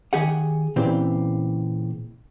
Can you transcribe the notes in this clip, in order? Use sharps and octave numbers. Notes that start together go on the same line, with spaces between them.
D#3 G4 G#4 F#5
A#2 C#3 E3 C4 G4